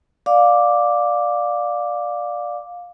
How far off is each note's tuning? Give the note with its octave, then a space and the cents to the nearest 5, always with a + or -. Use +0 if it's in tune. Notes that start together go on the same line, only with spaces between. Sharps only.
D5 +0 F5 +20 D6 +0